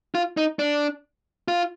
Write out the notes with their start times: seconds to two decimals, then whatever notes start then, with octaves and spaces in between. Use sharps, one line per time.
0.15 F4
0.37 D#4
0.59 D4
1.48 F4